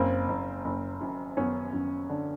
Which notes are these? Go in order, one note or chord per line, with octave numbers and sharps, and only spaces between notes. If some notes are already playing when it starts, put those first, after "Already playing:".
Already playing: F#1 A#3 C4
F#1
F#1
F#2
F#2 B3 C#4
F#2
D3